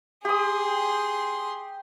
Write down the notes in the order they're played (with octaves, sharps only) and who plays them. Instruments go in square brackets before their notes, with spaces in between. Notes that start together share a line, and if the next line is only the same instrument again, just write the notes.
[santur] G4 D#6 [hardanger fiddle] G#4 C6